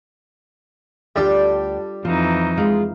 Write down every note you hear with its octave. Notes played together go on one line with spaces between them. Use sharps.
D2 G3 D4 F4 G4 A4 D5
F2 E3 F3 D#4 F4 A#5
G#3 F4 F5